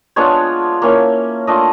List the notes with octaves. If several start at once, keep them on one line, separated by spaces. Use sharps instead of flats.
G#3 B3 D4 F4 C#5
A#3 C#4 E4
A3 D4 F4 D#5